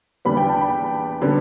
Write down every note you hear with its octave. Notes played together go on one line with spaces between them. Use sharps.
E2 D3 G3 B3 B5
G5
A5
B5
D3 G3 B3